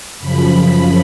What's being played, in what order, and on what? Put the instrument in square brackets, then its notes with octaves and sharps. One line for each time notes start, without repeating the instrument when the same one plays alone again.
[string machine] F#2 C#3 F3 B5